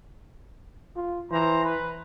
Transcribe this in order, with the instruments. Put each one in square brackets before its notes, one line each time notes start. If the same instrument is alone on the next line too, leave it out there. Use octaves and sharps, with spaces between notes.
[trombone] F4
[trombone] E3 [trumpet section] C5 A#5
[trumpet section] B4